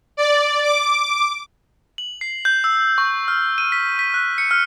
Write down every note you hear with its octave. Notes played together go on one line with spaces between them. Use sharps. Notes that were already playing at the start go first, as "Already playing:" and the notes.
D5
D6
F#7
C7
G6
E6
C#6
F6
D#7
B6
B6
F#6
C#7
F6